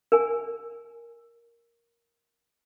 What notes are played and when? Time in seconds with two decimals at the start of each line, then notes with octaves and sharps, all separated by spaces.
0.12 A#4 G#5